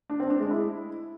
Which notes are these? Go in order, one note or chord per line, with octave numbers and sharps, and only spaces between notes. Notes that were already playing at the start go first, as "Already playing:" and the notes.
D4
C4
D4
G#3
E4